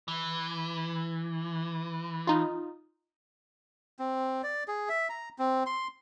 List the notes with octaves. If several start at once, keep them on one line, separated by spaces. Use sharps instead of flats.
E3
D#4 F4
C4
D5
G#4
E5
A#5
C4
C6